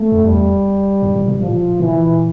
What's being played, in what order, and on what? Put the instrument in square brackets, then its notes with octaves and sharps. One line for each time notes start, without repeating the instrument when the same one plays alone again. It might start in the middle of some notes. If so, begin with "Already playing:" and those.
Already playing: [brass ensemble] A3
[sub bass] F2
[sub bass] E2 [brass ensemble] G3
[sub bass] G2
A2
A#2
[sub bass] A2 [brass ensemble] F3
[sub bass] A#2 [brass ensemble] E3